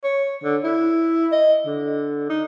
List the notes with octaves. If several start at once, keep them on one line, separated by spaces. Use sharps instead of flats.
C#5
D3
E4
D#5
D3
D#4